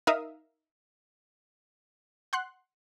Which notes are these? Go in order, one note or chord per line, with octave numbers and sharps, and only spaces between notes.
D#4 A#4 E5 F5 D#6
F#5 C6 F#6